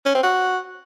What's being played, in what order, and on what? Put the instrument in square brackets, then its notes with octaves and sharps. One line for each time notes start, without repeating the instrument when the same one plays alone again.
[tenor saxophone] C#4
C4
F#4